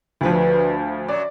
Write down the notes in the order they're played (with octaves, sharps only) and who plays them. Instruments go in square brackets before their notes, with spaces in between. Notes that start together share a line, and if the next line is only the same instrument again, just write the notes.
[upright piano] D2 F3 [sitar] G2 B4
[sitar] F#2 F#3 [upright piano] D5